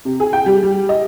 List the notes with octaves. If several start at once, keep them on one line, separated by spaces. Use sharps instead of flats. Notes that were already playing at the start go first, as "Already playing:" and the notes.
C3
G#4
G5
G3
G3
D#5